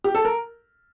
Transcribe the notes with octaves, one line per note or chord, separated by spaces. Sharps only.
G4
A4
A#4